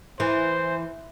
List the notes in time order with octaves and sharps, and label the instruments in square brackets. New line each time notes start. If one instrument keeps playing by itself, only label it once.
[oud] E3 [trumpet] C5